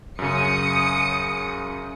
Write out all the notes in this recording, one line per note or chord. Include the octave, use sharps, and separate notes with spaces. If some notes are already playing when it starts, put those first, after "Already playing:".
F#2 C#3 D#6 C#7